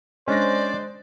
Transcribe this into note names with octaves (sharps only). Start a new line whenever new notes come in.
G#3 C#4 D4 C5 D5 A#6